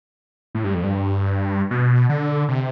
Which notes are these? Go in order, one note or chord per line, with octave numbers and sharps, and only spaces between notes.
A2
G2
F2
G2
B2
D3
C3